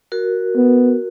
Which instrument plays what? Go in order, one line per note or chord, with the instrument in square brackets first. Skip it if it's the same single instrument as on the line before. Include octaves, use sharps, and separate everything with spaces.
[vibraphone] F#4 A#4
[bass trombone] B3